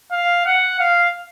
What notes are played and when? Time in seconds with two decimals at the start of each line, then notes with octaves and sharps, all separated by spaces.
0.12 F5
0.46 F#5
0.80 F5